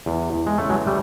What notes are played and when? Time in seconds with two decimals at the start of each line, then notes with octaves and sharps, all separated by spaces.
0.06 E2
0.33 E2
0.47 G#3
0.58 C#3 A3
0.70 F#3 G#3
0.86 E3 G3 A3